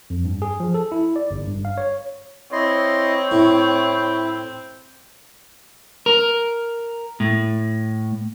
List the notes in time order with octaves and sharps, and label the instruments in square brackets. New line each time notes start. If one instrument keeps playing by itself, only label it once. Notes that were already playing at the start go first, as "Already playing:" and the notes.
[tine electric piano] F2
G2
G#4
F3
A4
E4
D5
G1
G2
F5
C#5
[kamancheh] C4 [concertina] E4 D#5 C6 [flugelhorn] C#5
[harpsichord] A2 [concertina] E4
[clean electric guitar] A#4
A2